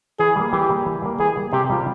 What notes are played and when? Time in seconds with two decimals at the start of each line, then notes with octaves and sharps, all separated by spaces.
0.19 E3 G#4
0.36 G3 A#3
0.52 E3 G4
0.69 G3 A#3
0.86 E3
1.02 G3 A#3
1.19 E3 G#4
1.36 G3 A#3
1.52 C3 G4
1.70 G3 C4 F4